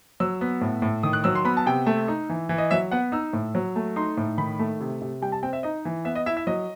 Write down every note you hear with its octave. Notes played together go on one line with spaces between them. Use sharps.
F#3 E6
B3
A2
A2
D#3 D#6
F#6
F#3 E6
C6
B3 B5
A5
C3 G5
A3
D#4
E3
E3
D#5
F#3 E5
B3 F#5
D#4 E6
A2
F#3
A3
D#4 C6
A2
D#3 B5
A3
C3
C3
G3 G5
A5
C4 G5
E5
D#4 D#5
E3
B3 E5
D#5
E4 E5
E5
F#3 D#5